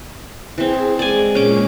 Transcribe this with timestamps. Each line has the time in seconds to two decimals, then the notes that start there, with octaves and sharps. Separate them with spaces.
0.58 E3 C4 G#4
0.99 G#3 D5 G#5
1.35 A#2 G#3 A#3 C#4 D6